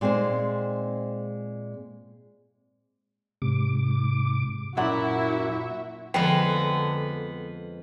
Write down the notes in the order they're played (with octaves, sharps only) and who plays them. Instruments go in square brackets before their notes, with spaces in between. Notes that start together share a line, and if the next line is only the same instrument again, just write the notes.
[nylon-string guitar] A#2 G#3 C4 D#4 C5
[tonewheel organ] G#2 D6 [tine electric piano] C3
[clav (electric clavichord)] F#2 [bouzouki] A#2 F#5 [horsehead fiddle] E4 [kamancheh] F#4 E5
[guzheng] F2 G#3 [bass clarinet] D3 [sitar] B3 [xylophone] G5